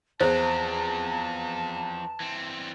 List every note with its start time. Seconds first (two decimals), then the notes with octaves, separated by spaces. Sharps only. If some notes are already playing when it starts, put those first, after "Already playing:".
0.21 E2 F3 C4 C5 A5
2.20 E3 C4